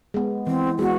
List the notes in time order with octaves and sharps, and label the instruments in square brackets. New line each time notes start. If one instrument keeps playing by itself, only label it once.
[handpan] G#3 B3
[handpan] E3 [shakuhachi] C4
[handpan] G#3 B3 [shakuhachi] F#4